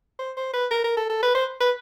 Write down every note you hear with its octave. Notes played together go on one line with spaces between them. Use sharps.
C5
C5
B4
A#4
A#4
A4
A4
B4
C5
B4